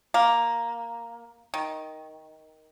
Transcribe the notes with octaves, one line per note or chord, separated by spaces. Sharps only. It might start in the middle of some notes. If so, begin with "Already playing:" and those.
A#3
D#3